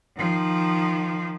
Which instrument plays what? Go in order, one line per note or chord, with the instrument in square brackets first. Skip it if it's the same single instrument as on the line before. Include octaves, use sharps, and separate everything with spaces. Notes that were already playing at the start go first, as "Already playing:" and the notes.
[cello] D#3 F3